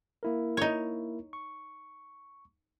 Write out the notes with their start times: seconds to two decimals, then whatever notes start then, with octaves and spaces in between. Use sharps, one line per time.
0.23 A#3 E4 A#4
0.57 D#4 C#5
1.33 C#6